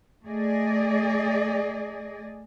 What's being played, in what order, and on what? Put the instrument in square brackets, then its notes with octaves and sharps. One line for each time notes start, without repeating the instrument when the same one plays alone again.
[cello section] A3 G#4 D5 D#5